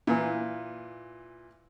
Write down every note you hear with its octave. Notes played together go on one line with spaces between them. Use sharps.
A#2 E3